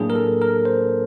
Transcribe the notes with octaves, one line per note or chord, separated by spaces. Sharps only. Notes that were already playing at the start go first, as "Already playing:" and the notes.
Already playing: A2 F#3 A#3 D4 G#4
A#4
A4
A#4
C5